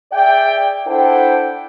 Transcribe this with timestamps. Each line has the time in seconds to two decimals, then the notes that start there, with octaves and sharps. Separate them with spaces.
0.12 G#4 D5 E5 G5
0.87 D4 E4 A4 C5 F#5 G5